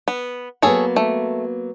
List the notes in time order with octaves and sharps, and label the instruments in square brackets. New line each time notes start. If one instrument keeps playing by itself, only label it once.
[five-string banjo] B3
[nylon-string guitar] F#3 A#3 B3 [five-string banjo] G#4 A4 C#5
[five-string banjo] A3